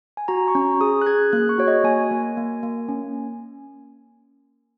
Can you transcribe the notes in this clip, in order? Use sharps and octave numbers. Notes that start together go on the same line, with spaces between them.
G#5
F#4 A#5
C#6
C#4 A#5
G#4 D#6
F#6
G#4 G#6
A#3 F#6
C#6
F#4 C#5
D#5
A#3 G#5
A#3
A#3
A#3
C#4